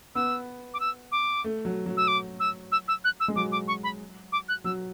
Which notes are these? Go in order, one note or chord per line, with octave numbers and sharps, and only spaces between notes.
B3 E6
D6
E6
D6
A3
F#3
F#3
E6
D6
E6
E6
E6
F#6
E6
G#3
F#3 D6
D6
C#6
B5
D6
F#6
F#3 E6